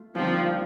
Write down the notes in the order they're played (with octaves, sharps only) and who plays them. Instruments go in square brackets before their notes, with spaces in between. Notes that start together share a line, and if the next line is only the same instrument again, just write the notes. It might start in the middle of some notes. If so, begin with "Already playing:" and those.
Already playing: [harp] A3 F4
[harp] D#2 D3 G3 C4 [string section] F3